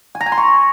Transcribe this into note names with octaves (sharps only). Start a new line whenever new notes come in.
G#5
A#5
G#5
C6
C#6